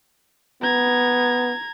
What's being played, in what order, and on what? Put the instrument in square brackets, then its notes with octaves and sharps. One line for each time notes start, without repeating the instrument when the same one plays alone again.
[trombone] B3 [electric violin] A#5 G#6